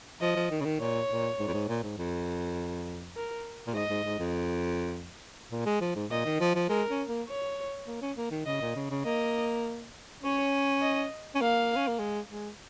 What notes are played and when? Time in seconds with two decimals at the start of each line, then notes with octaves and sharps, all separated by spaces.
0.21 F3 D#5
0.36 F3
0.51 D#3
0.61 C#3
0.65 D#3
0.80 A#2 C#5
1.09 A#2
1.39 G#2
1.48 F2
1.54 G#2
1.68 A#2
1.83 G#2
1.98 F2
3.16 A#4
3.67 A#2
3.74 G#2 D#5
3.90 G#2
4.05 G#2
4.19 F2
5.52 A#2
5.66 G#3
5.81 F3
5.96 G#2
6.11 A#2 D#5
6.25 D#3
6.40 F3
6.55 F3
6.69 G#3 A#4
6.90 C#4
7.09 A#3
7.29 C#5
7.87 A#3
8.02 C#4
8.17 A#3
8.31 D#3
8.46 C#3 D#5
8.61 A#2
8.76 C#3
8.91 C#3
9.05 A#3 D#5
10.23 C#4 C#5
10.82 D#5
11.35 C#4
11.41 A#3 F5
11.76 C#4
11.88 A#3
11.99 G#3
12.29 G#3